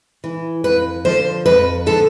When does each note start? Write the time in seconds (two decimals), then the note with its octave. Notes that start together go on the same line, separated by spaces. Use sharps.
0.24 E3
0.64 F2 B4
1.05 D3 F3 C5
1.46 F2 B4
1.86 D3 F3 A4